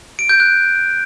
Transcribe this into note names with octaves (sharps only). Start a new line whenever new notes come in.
D7
G6
F#6